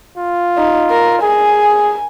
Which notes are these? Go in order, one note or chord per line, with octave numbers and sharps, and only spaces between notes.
F4
D#4
A#4
G#4 G#5